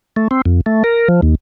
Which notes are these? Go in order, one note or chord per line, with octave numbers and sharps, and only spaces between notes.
A3
C4
F2
A3
A#4
F3
D#2